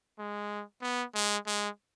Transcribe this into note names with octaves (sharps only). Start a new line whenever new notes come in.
G#3
B3
G#3
G#3